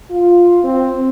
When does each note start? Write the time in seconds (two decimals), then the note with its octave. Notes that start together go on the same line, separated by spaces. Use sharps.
0.10 F4
0.64 C4